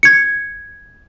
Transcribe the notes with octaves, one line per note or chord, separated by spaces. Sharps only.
G#6 C#7